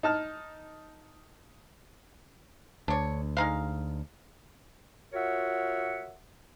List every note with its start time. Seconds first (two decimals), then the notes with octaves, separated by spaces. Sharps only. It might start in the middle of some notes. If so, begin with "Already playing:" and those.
0.03 D#4 A5 F6
2.88 D2 D4 C#5
3.37 G#3 D#4 F5
5.14 F4 F#4 A#4 C#5 E5 F#5